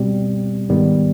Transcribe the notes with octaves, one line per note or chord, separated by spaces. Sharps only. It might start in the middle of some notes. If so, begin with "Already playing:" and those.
Already playing: B2 G3 C4
G#2 D#3 G3 B3